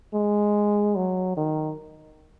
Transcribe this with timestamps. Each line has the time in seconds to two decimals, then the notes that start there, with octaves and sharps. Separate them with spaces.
0.14 G#3
0.96 F#3
1.37 D#3